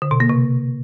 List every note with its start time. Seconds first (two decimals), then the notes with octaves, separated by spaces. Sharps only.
0.02 D3
0.11 B2
0.20 A#3
0.29 C3